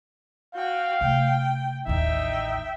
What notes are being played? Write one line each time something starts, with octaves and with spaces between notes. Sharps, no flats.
F#4 F5 G5
C3 A3 G5
A1 D#2 D#4 E5 G5